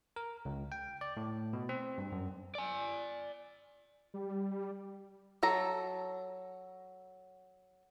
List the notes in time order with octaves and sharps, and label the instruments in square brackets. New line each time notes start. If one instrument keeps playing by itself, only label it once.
[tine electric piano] A#4
C#2
G5
D5
A2
B2
C4
G2
F#2
[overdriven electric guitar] D5 G#5
[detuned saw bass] G3
[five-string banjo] F#3 A4 A#5